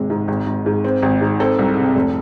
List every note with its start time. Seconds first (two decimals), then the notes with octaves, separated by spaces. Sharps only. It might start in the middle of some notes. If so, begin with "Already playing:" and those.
Already playing: G#1 C3 G#3
0.10 G#2
0.28 G#1
0.46 G#1
0.66 G#2
0.85 C4
1.02 G#1
1.21 G#2
1.40 C4 A4
1.59 C2
1.77 C3
1.96 F1